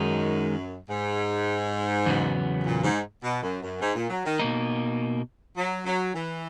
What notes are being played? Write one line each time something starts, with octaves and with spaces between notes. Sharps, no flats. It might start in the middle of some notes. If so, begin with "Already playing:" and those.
Already playing: F#2 D#3 G#3 D#4
G#2
E2 C#3 F#3 B3
A#2
G#2
B2
F#2
F#2
G#2
A#2
F#3
D#3
B2 A#3 D#4
F#3
F#3
E3